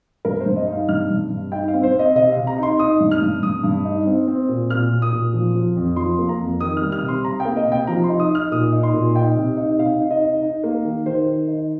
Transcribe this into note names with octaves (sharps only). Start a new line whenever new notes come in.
G2 A#4
C5
G2
D#5
D#4
F5
G2 F6
G2
G2
D#4 G5
F5
C4
C5
C4
D#5
C3 D#5
C3 F5
A#5
D#4 C6
D#4 D#6
G2
F6
G2
G2 D#6
G2
D#4
C4
C4
A#2
A#2 F6
A#2
D#6
A#2
F3
F3
F2
F3 C6
A#3
A#5
F2
D#3 D#6
G3 F6
F6
C3
C6
C3 A#5
G5
A#3
D#5
C3
G5
F3 A#5
C6
D#4
D#6
D#4 F6
A#2 D#6
D#4
C6
A#2
D#4 G5
C3
D#4
C3 F5
D#4
D#5
D#4
D#4
A#3
D#3
D#3 C5
D#3
D#4